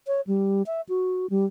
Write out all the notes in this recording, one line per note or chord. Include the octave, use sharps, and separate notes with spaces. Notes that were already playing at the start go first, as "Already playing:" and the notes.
C#5
G3
E5
F#4
G3